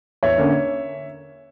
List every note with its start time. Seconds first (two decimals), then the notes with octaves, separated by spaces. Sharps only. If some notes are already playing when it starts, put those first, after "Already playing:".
0.23 E2 C#5 E5
0.38 D3 A#3 C#4